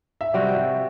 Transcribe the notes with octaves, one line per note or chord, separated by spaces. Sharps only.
E5
C3 G3 C4 F#4 D5
E5